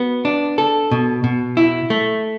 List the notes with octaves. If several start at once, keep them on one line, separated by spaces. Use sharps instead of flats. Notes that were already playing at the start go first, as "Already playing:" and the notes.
Already playing: B3 F#4
D4
A4
B2
B2
E4
A3